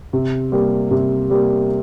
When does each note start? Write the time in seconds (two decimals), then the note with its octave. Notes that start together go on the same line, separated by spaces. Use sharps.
0.13 C3
0.52 G3 A#3
0.91 C3
1.30 G3 A#3